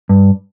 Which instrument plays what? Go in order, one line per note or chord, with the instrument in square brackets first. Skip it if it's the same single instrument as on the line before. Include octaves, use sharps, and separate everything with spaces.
[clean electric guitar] G2